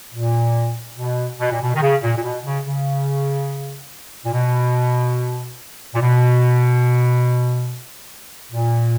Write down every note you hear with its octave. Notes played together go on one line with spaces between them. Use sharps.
A#2
B2
B2
A#2
B2
D#3
C#3
A#2
A#2
B2
C#3
C#3
A#2
B2
A#2
B2
A#2